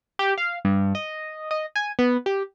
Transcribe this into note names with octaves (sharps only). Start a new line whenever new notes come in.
G4
F5
G2
D#5
D#5
G#5
B3
G4